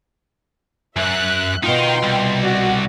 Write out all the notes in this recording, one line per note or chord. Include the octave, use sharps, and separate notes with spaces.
F#2 E5 F#6
B2 D#4 F4 A#4 G5 C6
C2
F#4 D5